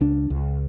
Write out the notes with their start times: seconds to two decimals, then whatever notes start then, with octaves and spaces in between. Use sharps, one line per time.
0.01 C#2 D4
0.30 C#2